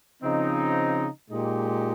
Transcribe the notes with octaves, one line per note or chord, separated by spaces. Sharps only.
C#3 F3 C4 D#4
A#2 G#3 D#4 G4